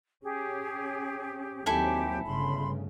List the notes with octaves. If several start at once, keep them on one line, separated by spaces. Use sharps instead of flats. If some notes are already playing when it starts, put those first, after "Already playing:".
C#4 G4 G#4
D#2 F#3 C4 E4 G4 A4 G#5
G1 C#3 A3 B5 C6